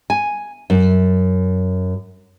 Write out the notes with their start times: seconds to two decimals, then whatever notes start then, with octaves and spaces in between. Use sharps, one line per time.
0.10 G#5
0.70 F#2